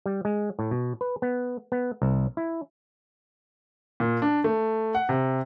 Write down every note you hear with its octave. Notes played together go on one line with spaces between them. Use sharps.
G3
G#3
A2
B2
B4
B3
B3
C2
E4
A#2
D4
A3
F#5
C3